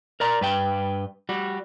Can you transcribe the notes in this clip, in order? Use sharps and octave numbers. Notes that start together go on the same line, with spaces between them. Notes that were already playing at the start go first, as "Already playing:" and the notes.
A#4 D5 A#5
G2 B4 G5
G3 F#4